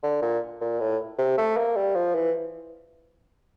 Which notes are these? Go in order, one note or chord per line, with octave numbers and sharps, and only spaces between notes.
D3
A#2
A#2
A2
C3
A3
A#3
G3
F3
E3